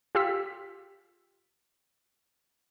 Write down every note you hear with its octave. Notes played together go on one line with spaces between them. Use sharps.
F4 G4 E6 B6